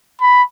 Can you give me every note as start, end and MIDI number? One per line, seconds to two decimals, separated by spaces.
0.21 0.43 83